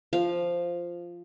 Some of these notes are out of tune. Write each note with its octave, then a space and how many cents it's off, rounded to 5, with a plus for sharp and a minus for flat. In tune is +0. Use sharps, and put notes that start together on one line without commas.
F3 -5 F5 +0